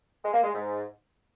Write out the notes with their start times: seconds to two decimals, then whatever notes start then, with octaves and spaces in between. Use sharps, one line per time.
0.23 G#3
0.34 A#3
0.44 G#3
0.54 G#2